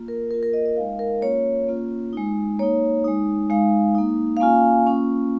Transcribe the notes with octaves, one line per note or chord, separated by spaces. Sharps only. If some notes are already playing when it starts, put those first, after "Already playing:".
Already playing: A#3 F4
A#4
A#3 F4 A#4
A#4
D#5
D#5
G#3 D#4 F5
A#4
A#3 C#4 F4 C#5
A#3 C#4 F4
G#3 D#4
A#3 D#4 C#5
G#3 D#4
G#3 D#4 F5
A#3 D#4
F5
A#3 C#4 F4 G#5
A#3 C#4 F4